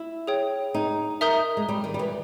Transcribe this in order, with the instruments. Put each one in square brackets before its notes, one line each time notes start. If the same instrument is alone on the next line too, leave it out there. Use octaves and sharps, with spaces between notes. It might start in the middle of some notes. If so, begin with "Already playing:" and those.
Already playing: [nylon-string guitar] E4
[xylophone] G#4 C#5 G5
[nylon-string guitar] D#4
[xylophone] A#4 E5 A#5 D#6 G6
[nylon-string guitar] G#3
G3
D#3
G3
E3